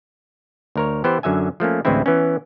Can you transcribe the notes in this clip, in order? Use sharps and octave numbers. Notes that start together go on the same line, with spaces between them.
D2 A#4 C#5
E3 B3 E4 G4 C5
F#2 D3 F#3 E5 G#5
F3 A3 A#3 C#4
A1 D2 E3 G#3 C4 E4
E3 B3 C#4